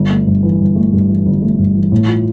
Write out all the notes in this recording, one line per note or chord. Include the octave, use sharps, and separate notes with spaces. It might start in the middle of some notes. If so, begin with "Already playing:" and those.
Already playing: G1
A3
G2
E3
G1
A3
G2
E3
G1
A3
G2
E3
A2
F4